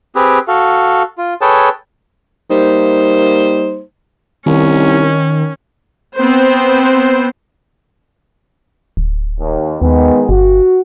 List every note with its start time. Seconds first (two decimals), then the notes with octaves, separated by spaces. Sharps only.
0.15 C4 G4 G#4 B4
0.48 F#4 A4 F5
1.18 F4
1.41 G#4 A4 B4 C#5 G5 A5
2.51 G3 A#3 D#4 C5
4.46 C2 D#3 C#4
6.16 B3 C4 C5
8.97 D1
9.40 D#2
9.82 D#2 D#3 G#3 B3
10.29 G1 F#4